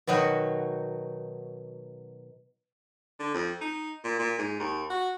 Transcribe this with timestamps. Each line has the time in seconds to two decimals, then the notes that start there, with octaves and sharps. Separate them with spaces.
0.07 B2 D#3 F#3 D#4 F#4
3.20 D3
3.34 F2
3.61 D#4
4.04 A#2
4.19 A#2
4.38 G#2
4.60 D#2
4.90 F#4